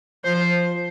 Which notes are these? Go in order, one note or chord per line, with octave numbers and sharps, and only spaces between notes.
F3 C5